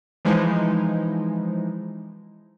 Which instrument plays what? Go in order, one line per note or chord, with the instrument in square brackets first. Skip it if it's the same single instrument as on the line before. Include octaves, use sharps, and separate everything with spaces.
[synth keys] E3 F3 G#3 D#4 E4